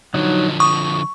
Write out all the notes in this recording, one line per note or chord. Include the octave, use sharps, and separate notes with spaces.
D3 F3 F#3 D#4
C#6 D#6